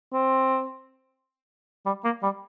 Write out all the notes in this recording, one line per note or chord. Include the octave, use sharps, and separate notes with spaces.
C4
G3
A#3
G3